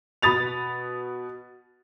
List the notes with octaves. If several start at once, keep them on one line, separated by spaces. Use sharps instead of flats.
B2 B5 D#6 A6 F7